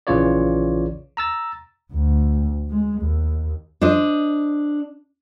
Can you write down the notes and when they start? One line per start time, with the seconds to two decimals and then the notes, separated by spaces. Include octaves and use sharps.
0.07 A#1 C#3 E3 F4 C#5 D5
1.17 A#5 E6 A6
1.93 D2
2.70 G#3
3.02 D#2
3.81 D4 C5 D#5